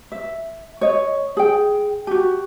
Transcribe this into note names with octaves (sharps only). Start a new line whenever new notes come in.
E5
C#5 D#5
G#4 G5
F#4 G4